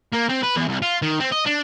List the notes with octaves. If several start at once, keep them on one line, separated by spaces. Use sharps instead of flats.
A#3
C4
B4
E2
C2
F4
D#3
C4
D#5
D4